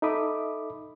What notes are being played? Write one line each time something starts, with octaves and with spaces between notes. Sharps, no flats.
D#4 A4 E5 B5 D6 D#6